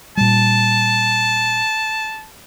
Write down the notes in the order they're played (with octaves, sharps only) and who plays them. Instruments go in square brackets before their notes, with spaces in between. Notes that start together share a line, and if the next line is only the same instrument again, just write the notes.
[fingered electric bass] A#2 G3 [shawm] A5